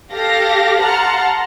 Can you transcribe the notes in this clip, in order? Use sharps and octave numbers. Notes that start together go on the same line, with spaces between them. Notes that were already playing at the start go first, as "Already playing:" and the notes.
G4 A4 F5 A#6
F#5 A5 A#5 C6 F6